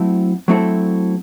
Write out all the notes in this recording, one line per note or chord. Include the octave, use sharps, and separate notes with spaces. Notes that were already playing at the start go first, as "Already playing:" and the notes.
Already playing: F#3 A3 C4 E4 A4
F#3 A3 C4 E4 A4